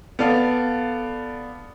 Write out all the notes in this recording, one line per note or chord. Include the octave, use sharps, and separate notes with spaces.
B3 A4 D5 F5